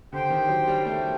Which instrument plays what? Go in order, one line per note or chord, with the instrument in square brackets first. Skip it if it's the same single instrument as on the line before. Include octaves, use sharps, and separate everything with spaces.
[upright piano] D3 [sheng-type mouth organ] G4 C5 G5
[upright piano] D#3
F#3
G3
[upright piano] A3 [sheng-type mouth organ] G4 C5 G5